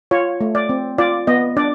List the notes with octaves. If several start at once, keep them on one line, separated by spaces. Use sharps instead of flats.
F4 C#5
A3
D5
C4
F4 D5
B3 D#5
D4 D5